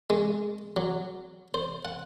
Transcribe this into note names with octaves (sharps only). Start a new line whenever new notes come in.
G#3
F#3
C5
F#5